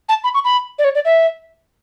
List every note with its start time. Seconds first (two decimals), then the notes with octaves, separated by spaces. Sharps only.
0.09 A5
0.24 B5
0.34 C#6
0.45 B5
0.79 D5
0.84 C#5
0.95 D5
1.05 E5